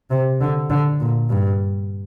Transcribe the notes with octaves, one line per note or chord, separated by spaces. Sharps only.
C3
D3
D3
A#2
G2